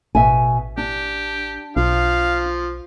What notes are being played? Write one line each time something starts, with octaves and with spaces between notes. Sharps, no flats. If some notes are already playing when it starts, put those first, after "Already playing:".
A1 B2 E5 G#5
D4 G4
B1 F3 F5